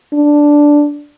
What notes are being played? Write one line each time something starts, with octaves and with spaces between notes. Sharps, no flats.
D4